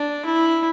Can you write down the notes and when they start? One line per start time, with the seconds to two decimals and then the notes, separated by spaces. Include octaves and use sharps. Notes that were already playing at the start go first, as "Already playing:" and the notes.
Already playing: D4
0.25 E4